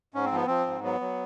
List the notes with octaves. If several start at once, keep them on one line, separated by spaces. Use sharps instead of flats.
G#2 C#4
C4
F3 B3
F3 C4
G#2
F#3 B3
F#3